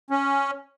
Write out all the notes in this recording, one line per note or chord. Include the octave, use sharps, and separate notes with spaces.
C#4